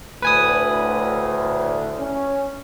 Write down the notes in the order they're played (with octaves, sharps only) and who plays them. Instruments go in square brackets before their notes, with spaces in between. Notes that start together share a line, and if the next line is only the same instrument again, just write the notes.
[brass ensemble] D2 A2 [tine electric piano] B4 G#5 D#6
[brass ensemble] C#4